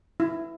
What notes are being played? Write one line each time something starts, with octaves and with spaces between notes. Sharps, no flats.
E4